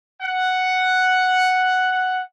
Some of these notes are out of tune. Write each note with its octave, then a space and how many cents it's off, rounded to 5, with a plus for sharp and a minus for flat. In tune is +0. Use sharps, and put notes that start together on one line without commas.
F#5 +0